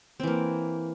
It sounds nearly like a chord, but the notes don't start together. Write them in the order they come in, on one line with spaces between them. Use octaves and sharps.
C4 E3 A#3